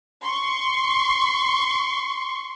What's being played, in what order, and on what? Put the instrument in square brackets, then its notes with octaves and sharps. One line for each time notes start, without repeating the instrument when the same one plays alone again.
[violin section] C6 C#6